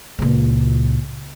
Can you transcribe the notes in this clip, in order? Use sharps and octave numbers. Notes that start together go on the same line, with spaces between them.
C#2 A#2